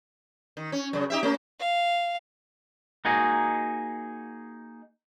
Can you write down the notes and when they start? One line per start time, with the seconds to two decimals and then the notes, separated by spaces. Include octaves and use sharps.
0.57 D#3
0.72 C#4
0.93 F#2 C#3
1.10 D#4 G4 E5
1.23 A3 C#4
1.60 F5
3.05 A#3 D#4 F#4 G#4